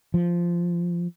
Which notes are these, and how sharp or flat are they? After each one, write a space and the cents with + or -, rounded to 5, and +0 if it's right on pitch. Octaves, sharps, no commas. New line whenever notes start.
F3 -10